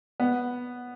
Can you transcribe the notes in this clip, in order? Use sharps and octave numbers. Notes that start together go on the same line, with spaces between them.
B3